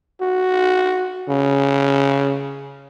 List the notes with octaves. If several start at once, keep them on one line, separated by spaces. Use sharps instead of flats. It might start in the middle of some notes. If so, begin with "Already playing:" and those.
F#4
C#3